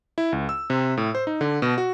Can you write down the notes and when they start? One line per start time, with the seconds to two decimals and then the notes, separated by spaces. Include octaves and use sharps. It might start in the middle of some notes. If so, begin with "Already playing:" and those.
0.18 E4
0.33 C#2
0.49 E6
0.70 C3
0.97 A2
1.15 C5
1.27 D#4
1.41 D3
1.62 B2
1.78 F#4